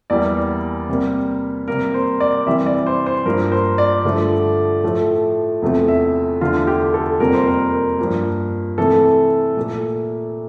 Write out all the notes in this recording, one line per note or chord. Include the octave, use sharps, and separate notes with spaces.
E2 E3 G3 A#3 D5
C3 G3 A#3
C3 G3 A#3 A#4
C5
D5
C3 E3 G3 E5
D5
C5
C5
G2 F3 A#3 A#4
C5
D5
G2 D3 F3 A3
A2 F3 A3
E2 C3 F3 A3
E5
E2 D3 A3 F4
G4
A4
F2 C3 G3 A#3 A#4
C5
A#4
G2 F3 A#3
C3 E3 A3 A4
A#2 A3